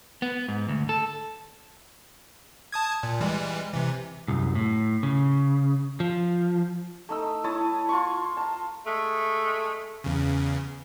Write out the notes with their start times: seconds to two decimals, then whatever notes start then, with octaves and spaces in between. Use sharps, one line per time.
0.22 B3
0.48 G#2
0.68 D2
0.89 A4
2.72 A5 D#6 G#6
3.03 A#2
3.20 E3 G3 G#3
3.73 C3 E3
4.28 C2 F#2
4.55 A2
5.03 C#3
6.00 F3
7.09 A3 D#4 E6
7.44 E4 C#5 A5 D#6
7.89 F4 C6 C#6
8.37 A5 A#5
8.86 G#3 A3
10.04 E2 C#3